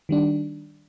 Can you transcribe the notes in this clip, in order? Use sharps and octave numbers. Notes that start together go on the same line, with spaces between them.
D#3 G3 D4